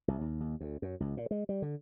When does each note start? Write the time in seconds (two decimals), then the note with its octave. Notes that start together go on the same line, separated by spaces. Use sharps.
0.08 C2
0.21 D#2
0.40 D#2
0.61 D2
0.82 F#2
1.00 C#2
1.17 A#2
1.31 G#3
1.49 G3
1.62 D3